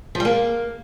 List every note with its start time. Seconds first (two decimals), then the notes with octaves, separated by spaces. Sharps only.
0.15 F3
0.20 G3
0.25 A#3